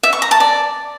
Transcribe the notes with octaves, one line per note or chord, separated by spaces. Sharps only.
E5
C#6
A#5
A5
D5